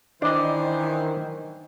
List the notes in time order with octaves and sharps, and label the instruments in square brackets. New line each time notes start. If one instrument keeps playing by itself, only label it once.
[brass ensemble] D#3 [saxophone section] E3 C5 [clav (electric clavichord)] D4 D#5